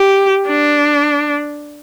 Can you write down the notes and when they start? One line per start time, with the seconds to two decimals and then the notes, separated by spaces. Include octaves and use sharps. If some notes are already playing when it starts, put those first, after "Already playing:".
Already playing: G4
0.47 D4